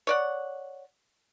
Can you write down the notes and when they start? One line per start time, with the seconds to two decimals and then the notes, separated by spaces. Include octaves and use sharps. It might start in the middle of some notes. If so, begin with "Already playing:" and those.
0.07 C#5 D5 F#5